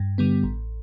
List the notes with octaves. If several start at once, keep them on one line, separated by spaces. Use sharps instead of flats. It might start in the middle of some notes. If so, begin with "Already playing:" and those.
Already playing: G2
D3 G3 B3
A1